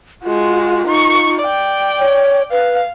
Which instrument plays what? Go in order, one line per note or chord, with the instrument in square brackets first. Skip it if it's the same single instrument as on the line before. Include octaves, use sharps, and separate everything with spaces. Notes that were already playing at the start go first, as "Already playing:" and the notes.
[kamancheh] G#3 F#4 [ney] F4
[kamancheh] D#4 C#6
D5 G5
[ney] C#5
[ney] B4 [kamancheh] F5